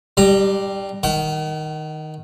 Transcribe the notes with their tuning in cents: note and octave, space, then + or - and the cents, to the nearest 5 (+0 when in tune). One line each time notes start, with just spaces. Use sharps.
G3 +0 D4 +45 A#5 +0
D#3 +0 F#5 +40